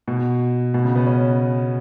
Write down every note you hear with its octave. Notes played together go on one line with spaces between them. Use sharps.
B2
B2
C#3
B3
C#4